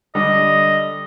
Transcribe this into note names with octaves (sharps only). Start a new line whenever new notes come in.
D3 G3 D#5